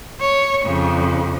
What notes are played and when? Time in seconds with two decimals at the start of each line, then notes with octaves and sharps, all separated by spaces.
0.21 C#5
0.66 F2 C#3